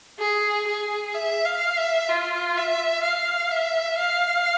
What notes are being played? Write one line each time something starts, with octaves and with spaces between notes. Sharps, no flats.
G#4
G#4
E5
F5
E5
F4
E5
F5
E5
F5